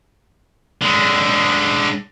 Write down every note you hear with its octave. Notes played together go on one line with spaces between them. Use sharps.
D3 G#3